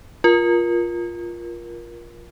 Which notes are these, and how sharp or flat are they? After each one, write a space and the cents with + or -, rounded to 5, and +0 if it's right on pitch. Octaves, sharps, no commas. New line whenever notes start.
F4 +0 A#4 +25